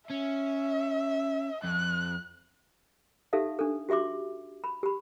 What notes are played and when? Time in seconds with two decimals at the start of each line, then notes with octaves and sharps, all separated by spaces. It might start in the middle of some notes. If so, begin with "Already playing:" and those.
0.11 C#4 E5
1.64 F2 F#6
3.33 D#4 G4 A4 E5 F5
3.59 D4 A4
3.89 F#4 G4 E5 C6 D6
4.64 B5
4.83 G4 B5